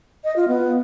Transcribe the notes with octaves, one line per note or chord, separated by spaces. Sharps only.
D#5
F4
B3